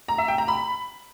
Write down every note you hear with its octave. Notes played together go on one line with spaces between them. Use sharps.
A#5
E5
G5
A#5
B5